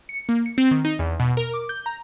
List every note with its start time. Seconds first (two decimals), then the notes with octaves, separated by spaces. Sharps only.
0.09 C#7
0.29 A#3
0.46 C#7
0.58 C4
0.71 D#3
0.85 D#4
0.99 E2
1.20 B2
1.37 A#4
1.54 D6
1.69 G6
1.86 A#5